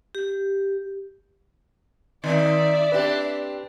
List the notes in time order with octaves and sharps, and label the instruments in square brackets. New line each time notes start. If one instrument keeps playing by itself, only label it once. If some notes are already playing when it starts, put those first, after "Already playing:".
[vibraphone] G4
[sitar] D#3 C4 D#4 [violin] D5 E5
[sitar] C4 D4 G4 [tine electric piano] B4